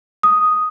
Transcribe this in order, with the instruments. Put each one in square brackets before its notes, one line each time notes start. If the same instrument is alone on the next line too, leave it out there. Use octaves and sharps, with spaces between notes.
[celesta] D#6